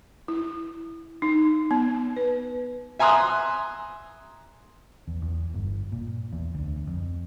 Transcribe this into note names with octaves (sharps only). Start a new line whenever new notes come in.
E4
D#4
B3
B4
E5 G#5 A#5 C6 D#6 F#6
E2
E2
G1
A#2
E2
D2
F2